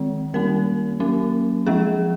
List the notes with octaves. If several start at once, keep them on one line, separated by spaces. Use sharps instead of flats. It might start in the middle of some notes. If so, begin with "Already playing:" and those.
Already playing: D#3 G#3 C4
D#3 G3 A#3 C#4 A#4
F#3 A#3 C#4
F3 G#3 C4 G#4